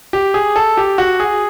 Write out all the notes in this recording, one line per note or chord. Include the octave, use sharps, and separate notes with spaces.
G4
G#4
A4
G4
F#4
G#4